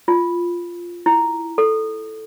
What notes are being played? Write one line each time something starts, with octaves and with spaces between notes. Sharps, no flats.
F4
E4
A4